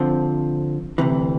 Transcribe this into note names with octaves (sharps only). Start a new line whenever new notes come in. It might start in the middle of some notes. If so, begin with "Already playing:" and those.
Already playing: D3 F3 C4
D2 C3 E3